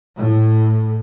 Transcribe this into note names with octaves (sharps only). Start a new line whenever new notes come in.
A2